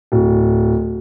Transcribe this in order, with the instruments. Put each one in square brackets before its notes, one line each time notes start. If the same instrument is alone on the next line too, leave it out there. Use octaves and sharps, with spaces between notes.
[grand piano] D1